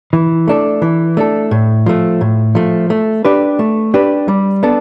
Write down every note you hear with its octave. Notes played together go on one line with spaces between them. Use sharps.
E3
A3 D4 A4
E3
A3 D4 A4
A2
F3 A3
A2
F3 A3
A3
D4 G4 B4
A3
D4 G4 B4
G3
B3 D4 A4